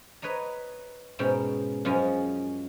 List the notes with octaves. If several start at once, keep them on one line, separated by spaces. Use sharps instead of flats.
B4 C#5 D#5 A#5
G#2 B2 C#4 G5
F#2 F3 G#3 C#4 D#5